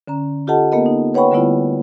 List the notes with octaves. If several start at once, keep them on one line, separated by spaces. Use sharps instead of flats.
D3 C#4 A#5
F4 G4 A4 D#5 F#5 A5
A#3 B3 A#4 D#5
D#4
B4 C#5 F#5 G5 B5 C#6
D3 G3 A3 B3 E4 F4